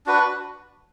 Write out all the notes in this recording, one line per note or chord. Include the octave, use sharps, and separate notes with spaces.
D4 F#4 B4